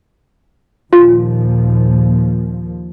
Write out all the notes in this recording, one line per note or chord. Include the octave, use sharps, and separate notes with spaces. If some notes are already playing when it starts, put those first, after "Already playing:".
D#2 A#2 F3 F4